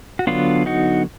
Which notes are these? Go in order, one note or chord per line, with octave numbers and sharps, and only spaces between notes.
F#4
D3 F#3 B3 D4 F4
D#4 F#4